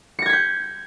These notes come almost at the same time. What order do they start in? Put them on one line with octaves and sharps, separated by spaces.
C#7 A#6 G#6 B6 G6